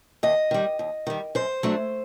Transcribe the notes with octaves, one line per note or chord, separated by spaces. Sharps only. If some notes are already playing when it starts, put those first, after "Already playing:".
D#2 D#5
D#3 G3
D#2
D#3 G3
F#2 C5
F#3 A3 D4